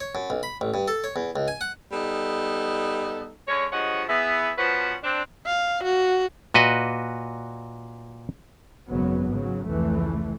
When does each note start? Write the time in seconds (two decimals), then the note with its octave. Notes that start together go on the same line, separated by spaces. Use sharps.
0.01 C#5
0.15 F#2
0.30 B1
0.43 B5
0.61 A1
0.74 G2
0.88 A4
1.04 C#5
1.16 E2
1.36 C#2
1.48 G#5
1.61 F#5
1.92 G3 B3 D#4 A4
3.48 D3 G#3 C#4 C#5
3.72 G2 F3 G#3 C#5 D#5 F#5
4.09 B3 E4 G#4
4.58 B2 F3 C#4 B4 C5 F#5
5.03 C4 D4
5.46 F5
5.84 F#4
6.54 A#2 F#4 B4 D#5
8.89 G#1 F#2 C#3 F#3 B3
9.28 G#2 C#3 F#3
9.68 F1 C#2 E3 A3